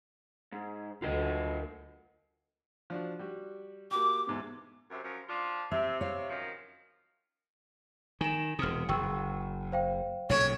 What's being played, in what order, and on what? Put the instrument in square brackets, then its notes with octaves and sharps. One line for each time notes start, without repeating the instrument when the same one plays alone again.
[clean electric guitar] G#2
[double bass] D2 [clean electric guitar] F4 A#4 D#5
[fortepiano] F3 D4 F#4
G3 F#4
[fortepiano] A#3 F#4 G4 [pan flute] D6
[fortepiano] E2 G#2 B2
[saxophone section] F#2 C3
F#2 F3
F3 D4 F4
[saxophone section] C3 [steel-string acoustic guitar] E5
[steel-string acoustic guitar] C#5 F5
[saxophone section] F#2 D#3 F3
[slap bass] D#3 [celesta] G#5 E7
[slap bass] E1 C3 [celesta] D#6 F6
[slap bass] F#1 [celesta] G5 C#6 E6
[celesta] C5 F5 G5
[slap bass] B1 A#2 C#3 [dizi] C#5